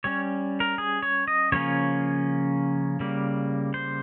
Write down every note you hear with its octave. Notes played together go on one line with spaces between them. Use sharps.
G3 C#4 C#5
A#4
G#4
C#5
D#5
C#3 F3 A#3 C#4 C#5
C#3 G3 A#3
C5